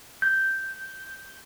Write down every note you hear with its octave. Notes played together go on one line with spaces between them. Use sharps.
G6